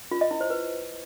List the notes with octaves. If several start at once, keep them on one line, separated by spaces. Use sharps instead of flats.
F4
D#5
E4
C5
B4